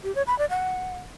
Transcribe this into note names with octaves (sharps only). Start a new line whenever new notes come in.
G4
C#5
B5
D5
F#5